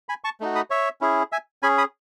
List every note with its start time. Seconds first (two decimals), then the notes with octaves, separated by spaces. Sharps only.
0.09 G#5 B5
0.24 A5 C#6
0.40 A3 D#4 F#4
0.55 B5 D#6
0.70 C#5 E5
1.01 C#4 E4 G#4
1.32 E5 G#5
1.63 C#4 G#4 G#5 B5
1.78 B5 D#6